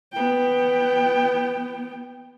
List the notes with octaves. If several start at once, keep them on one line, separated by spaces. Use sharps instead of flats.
B3 G5